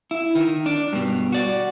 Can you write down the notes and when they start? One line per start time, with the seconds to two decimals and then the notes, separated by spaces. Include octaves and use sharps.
0.11 E4
0.35 D#3
0.66 D4
0.93 G2 B2
1.32 F#4 D5